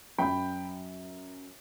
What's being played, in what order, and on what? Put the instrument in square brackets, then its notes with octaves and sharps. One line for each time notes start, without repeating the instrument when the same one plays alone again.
[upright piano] F#2 F#3 G5 B5